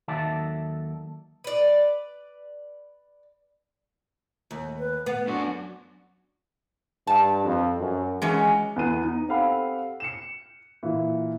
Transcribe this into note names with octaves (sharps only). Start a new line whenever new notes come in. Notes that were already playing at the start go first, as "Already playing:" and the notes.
D#2 D#3 F#3 A4 D5 E5
B4 D5
D#2
B4
B3 F#5
F#2 D4 F#4
G2 A5
F2
F#2
E3 F#3 G#3 C#4
E2 B3 D#7
D#4
C4 G4 A4 F5 F#5 B5
C#7 E7
A#2 E3